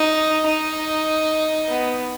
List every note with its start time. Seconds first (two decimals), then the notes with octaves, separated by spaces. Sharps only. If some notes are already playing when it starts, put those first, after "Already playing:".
Already playing: D#4
0.46 D#4
1.68 B3